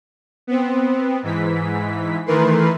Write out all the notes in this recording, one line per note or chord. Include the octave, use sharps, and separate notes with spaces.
B3 C4
G#2 E3 B6
D#3 E3 A3 A#4 B4 C6